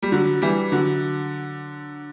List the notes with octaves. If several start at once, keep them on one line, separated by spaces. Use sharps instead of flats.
G3
D3 F#3
E3 G3
D3 F#3